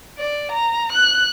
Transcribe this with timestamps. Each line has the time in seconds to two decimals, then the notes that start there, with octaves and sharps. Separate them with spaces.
0.18 D5
0.52 A#5
0.93 F#6